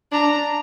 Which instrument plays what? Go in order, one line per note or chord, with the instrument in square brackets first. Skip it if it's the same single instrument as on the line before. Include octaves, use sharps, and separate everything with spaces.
[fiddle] D4 [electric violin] A#5